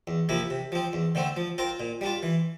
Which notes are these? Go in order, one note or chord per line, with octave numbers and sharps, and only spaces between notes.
E2
C3 F3 A#3 E4
C3
F3 C4
E2
D3 A3 C4
F3
C4 F4 A#4
A#2
G3 D4 F4
E3